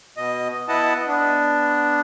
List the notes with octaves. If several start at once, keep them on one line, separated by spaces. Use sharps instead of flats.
B2 D#5
B3 E4 D#5 F#5 A5
B3 D4